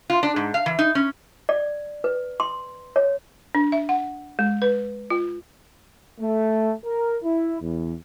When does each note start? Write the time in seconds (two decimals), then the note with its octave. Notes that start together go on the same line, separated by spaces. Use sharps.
0.10 F4
0.23 D4
0.36 G#2
0.54 F5
0.66 E3
0.79 D#4
0.95 C#4
1.49 D5
2.04 B4
2.40 C6
2.96 C#5
3.55 D4
3.72 E5
3.89 F#5
4.39 G#3
4.62 B4
5.10 F4
6.20 A3
6.84 A#4
7.24 E4
7.61 E2